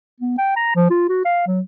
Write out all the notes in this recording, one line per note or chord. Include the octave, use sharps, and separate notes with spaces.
B3
G5
A#5
F3
F4
F#4
F5
F#3